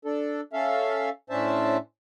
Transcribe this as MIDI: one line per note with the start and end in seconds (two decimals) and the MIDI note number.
0.05 0.41 62
0.05 0.41 69
0.53 1.09 61
0.53 1.09 69
0.53 1.09 76
0.53 1.09 77
1.30 1.77 45
1.30 1.77 61
1.30 1.77 62
1.30 1.77 72
1.30 1.77 76
1.30 1.77 81